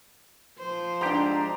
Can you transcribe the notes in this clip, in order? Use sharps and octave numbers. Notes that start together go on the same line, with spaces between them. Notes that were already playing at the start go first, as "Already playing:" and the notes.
F3 C5
G#2 D4 G4 G5 A#5